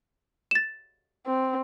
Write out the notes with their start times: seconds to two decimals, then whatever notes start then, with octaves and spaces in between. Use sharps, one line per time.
0.51 A6 E7
1.27 C4